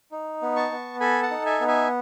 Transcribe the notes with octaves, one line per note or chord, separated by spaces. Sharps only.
D#4
B3
A5 C#6
B3
A4 G#5 B5
F#5 A5
D#4
E5 G#5
B3
E5 G#5